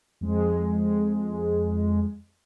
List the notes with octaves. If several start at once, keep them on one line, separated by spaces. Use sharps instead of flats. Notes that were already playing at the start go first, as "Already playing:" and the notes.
F2 G#3